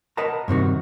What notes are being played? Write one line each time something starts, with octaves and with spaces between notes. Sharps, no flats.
A#4 B4 D#5 F#5 A5 A#5
G2 C3 D#3 F#4